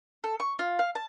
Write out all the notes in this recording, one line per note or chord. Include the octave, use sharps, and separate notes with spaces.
A4
C#6
F4
F5
A5